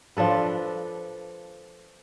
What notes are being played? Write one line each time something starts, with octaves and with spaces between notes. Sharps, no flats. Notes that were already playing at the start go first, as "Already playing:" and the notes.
F3 D4 A4 B4